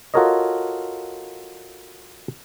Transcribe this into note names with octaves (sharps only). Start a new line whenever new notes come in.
F4 F#4 A4 A#4 C#5 D#5